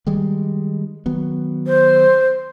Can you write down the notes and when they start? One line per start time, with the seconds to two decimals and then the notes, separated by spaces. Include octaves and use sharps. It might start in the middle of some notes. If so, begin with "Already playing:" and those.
0.07 D#3 G3 G#3
1.06 D#3 F#3 B3
1.66 C5